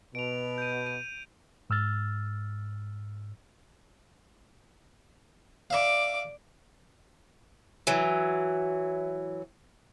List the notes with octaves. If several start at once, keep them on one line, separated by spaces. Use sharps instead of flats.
B2 D7 F7
G6 D#7
D#7
G#2 E6 F6 A6
D5 E5 F5 D6
E3 F#3